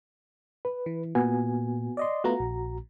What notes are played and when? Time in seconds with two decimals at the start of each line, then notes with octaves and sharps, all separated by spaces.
0.65 B4
0.86 E3
1.15 A#2 B3 F#4 G#5
1.97 D5 D#5 C6
2.24 A3 B3 F4 F#4 A#5
2.40 A#1